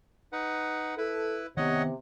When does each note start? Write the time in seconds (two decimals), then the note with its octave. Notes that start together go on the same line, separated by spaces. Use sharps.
0.33 D#4 B4 F#5
0.98 E4 A4 B4
1.57 C3 D#3 B3 C#5 D#5 F#5